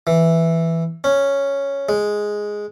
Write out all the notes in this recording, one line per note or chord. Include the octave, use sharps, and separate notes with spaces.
E3
C#4
G#3